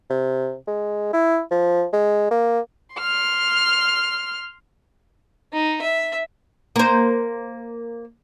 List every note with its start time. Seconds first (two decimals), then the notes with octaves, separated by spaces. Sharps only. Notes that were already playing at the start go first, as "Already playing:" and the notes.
0.10 C3
0.67 G#3
1.13 E4
1.51 F3
1.93 G#3
2.31 A#3
2.96 C6 F6
5.53 D#4
5.82 E5
6.76 A#3 C5